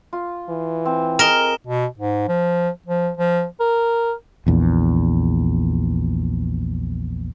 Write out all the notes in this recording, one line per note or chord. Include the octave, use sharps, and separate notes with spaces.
F4
E3
C4
G#4 A#4 D#5 E7 G7
B2
G#2
F3
F3
F3
A#4
A#1 E2 A#2